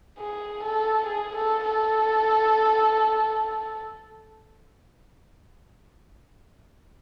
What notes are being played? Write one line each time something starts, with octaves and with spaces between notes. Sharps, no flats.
G#4
A4
G#4
A4
A4